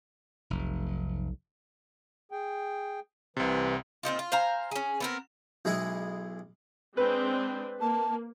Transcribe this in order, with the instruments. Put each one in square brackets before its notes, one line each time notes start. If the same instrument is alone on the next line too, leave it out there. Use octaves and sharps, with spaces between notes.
[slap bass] F1 [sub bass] B1
[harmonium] G#4 G5
[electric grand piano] C2 C3 [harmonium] E3
[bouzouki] A#2 C4 D#4 F4
F4
C5 F5 G#5 A#5
C#4 G#4
B3 C4 A#4
[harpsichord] B1 G#3 E4 G#4
[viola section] G#3 C4 D4 [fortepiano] B4
[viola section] A#3 [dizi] A5